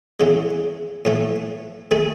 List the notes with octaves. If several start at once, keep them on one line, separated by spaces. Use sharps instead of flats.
E2 C#3 E3 G#3
A2 E3 A3
D#3 A3 D#4 G#4